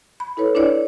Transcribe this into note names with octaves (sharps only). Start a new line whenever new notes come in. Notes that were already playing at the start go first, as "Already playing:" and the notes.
B5
E4 A4 B4 C#5
D4 E4 C#5 D5